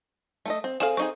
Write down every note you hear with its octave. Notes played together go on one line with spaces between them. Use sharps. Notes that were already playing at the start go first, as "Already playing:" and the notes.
A3 A4 D#5
C4
C4 G#4 A4 F5 G#5
C4 D#4 G#4 C#6